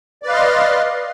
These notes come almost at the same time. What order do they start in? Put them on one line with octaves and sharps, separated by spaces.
D5 B4 F5 D#5 C6